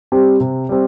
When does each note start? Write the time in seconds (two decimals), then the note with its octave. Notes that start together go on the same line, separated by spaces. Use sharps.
0.12 G3 C4 G4
0.40 C3
0.69 G3 C4